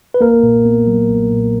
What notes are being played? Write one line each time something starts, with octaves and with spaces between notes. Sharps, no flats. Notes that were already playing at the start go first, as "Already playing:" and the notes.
B4
B1 A#3 A#4
A#2
B3
F#3
B1
A#2